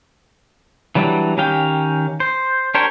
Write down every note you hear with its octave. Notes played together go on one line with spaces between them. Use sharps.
E3 F#3 G3 D4
D#3 C#4 G4 F5 G5
C5
D4 G4 A#4 C5 C#5